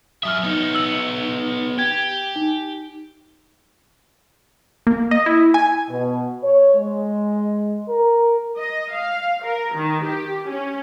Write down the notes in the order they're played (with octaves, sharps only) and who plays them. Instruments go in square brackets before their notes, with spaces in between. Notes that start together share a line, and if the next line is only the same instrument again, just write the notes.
[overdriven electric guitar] F#3 E5 [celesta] D#6 F6
[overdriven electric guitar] B3 D#4
[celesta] E6 F#7
[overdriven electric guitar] G4 [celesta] G#6
[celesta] D#4
[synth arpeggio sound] A#3
D#5
E4
G#5
[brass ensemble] B2
C#5
G#3
A#4
[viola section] D#5
F5
A#4
D#3
G4
C#4